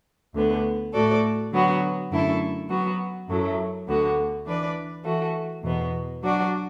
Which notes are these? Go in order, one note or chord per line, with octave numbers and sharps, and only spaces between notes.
D2 D3 B3
A2 A3 F#4 A4 D5
D3 F#3 B3 F#4
F#2 D3 A3 E4 A4
F#3 B3 F#4
F#2 F#3 A3 E4
D2 D3 B3 F#4
E3 D4 B4 D5
E3 A3 F#4
E2 B2 B3
F#3 D4 F#4 D5